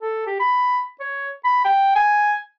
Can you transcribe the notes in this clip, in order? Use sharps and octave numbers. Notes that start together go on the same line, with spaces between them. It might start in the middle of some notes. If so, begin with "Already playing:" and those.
A4
G4
B5
C#5
B5
G5
G#5